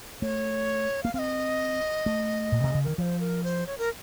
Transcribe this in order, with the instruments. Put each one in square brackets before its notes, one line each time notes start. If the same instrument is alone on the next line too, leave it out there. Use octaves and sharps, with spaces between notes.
[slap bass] A3 [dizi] C#5
[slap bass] A#3 [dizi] F5
[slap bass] C4 [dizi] F5
[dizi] D#5
[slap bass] A3
A#2
C3
C#3
[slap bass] D#3 [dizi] A#4
[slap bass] F3 [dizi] C5 C#5
[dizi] A#4
C5
C#5
A#4